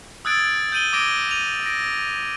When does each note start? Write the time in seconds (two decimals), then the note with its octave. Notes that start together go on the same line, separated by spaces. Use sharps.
0.25 D#6 E6 F#6 G#6 A6 D7
0.72 G6 D7 D#7 F#7 G7
0.93 D6 D#6 G#6 A#6 D7 G7
1.29 D#7 F7
1.66 A#6 D7